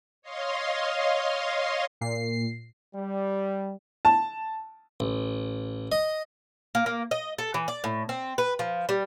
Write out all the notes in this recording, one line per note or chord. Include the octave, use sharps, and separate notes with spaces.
C#5 D#5 F5 C6
A#2 C7
G3
A5
A1
D#5
A#3
A#3
D#5
A4
E3
D5
A2
C4
B4
F3
G3